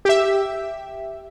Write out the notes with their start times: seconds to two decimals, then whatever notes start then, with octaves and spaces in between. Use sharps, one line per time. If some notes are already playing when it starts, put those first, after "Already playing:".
0.05 G4 E5